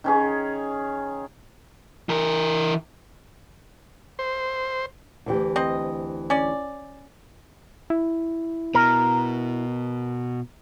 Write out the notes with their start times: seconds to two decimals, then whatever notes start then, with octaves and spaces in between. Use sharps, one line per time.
0.04 D#3 C#4 G#4
2.09 E3 A#4
4.19 C5
5.26 D2 E3 G4
5.56 C4 D#5
6.30 C#4 D5
7.90 E4
8.75 B2 A#4